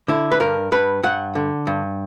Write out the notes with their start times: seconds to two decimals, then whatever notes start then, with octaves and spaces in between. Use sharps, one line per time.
0.08 D3 E4
0.32 B4
0.40 G2 A#4
0.72 G2 B4
1.03 G2 F#5
1.35 D3
1.67 G2